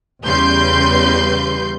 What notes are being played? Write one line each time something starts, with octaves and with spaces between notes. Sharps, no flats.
E2 C#3 G3 B4 C6 G6